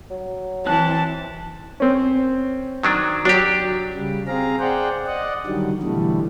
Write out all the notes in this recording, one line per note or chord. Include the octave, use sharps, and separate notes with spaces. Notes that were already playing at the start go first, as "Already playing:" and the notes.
F#3
E3 C4 A5 F#6
C4 C#4
D#3 F#3 D4
F#3 D4 G4
C#3 G3
C4 G#4 F5 A#5
G#4 C5 D5 F#5 G5
D5 D#5 F#5
D3 D#3 F#3 G3
B2 D3 E3 G3 A3